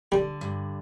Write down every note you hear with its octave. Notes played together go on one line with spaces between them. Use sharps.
D3 G3
G2